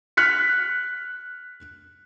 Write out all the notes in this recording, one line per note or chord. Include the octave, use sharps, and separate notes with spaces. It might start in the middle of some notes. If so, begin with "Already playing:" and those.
F6 F#6 B6 C#7